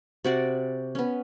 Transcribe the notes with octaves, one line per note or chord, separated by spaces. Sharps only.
C3 F#4 D5
B3 C#4